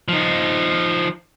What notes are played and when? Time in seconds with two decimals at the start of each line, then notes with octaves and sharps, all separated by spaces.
0.08 F3 D#4